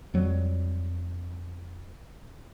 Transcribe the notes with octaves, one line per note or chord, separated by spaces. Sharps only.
F2 F#3 G3